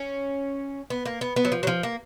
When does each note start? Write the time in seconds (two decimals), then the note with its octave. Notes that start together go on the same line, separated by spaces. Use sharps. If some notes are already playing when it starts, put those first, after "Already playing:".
Already playing: C#4
0.90 B3
1.06 A#3
1.21 B3
1.36 B3
1.45 F#3
1.52 F3
1.63 F#3
1.67 F3
1.83 A#3